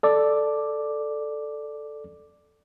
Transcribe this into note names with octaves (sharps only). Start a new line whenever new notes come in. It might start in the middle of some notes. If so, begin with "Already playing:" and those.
A4 D5 D6